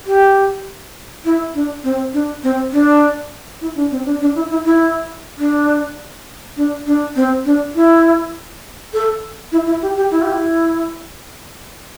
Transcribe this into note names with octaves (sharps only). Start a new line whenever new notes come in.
G4
E4
D4
C4
D4
C4
D4
E4
D4
C4
D4
D4
E4
E4
E4
D4
D4
D4
C4
D4
E4
A4
E4
E4
G4
G4
E4
G4
E4